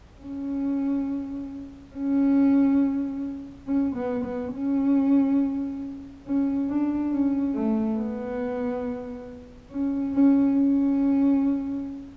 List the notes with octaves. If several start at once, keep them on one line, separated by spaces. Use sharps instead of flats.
C#4
C#4
C#4
B3
B3
C#4
C#4
D4
C#4
A3
B3
C#4
C#4
C#4